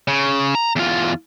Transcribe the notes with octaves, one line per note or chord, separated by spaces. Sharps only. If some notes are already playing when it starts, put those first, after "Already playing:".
C#3
A#5
E2 F4